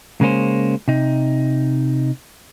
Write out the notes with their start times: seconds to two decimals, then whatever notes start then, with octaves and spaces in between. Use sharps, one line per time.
0.21 C#3 G#3 A#3 C#4 C5
0.88 C3 D#4